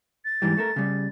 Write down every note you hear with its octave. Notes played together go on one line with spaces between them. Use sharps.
A6
G#2 E3 G3
A3 A4 A#4
C#3 G3